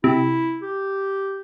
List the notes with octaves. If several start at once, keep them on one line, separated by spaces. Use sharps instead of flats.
C3 E4
G4